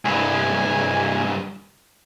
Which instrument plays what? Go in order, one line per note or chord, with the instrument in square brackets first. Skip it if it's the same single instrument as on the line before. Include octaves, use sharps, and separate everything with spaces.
[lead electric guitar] C2 G2 [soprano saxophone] G#5